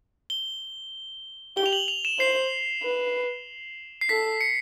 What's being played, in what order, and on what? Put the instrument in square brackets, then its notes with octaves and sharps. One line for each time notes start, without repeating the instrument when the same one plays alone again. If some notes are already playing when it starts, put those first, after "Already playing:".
[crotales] G7
[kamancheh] G4 [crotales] G7
[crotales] F7
F#7
F7
E7
[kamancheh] C5 [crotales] C7
[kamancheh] B4
[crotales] C7
[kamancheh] A4 [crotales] B6
[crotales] C#7